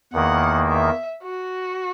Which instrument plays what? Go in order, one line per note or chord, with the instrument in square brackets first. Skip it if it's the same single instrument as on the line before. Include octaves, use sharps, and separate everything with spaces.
[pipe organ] E2 D#3 A#3 [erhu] F#5
[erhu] E5
F#4